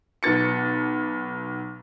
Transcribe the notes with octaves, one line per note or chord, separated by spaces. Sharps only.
B1 B3 A6 C#7